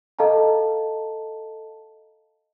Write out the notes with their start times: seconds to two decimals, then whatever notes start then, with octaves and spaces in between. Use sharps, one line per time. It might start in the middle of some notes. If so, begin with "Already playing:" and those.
0.19 A4 D#5 F5 A5 A#5